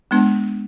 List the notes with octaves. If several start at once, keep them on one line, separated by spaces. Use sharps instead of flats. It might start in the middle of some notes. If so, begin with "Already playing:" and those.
G#3 B3 D4